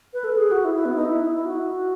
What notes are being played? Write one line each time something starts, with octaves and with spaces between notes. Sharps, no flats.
B4
A4
G#4
F#4
E4
E4
B3
D#4
E4
E4
F#4